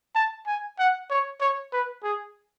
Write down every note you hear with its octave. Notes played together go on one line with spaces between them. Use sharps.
A5
G#5
F#5
C#5
C#5
B4
G#4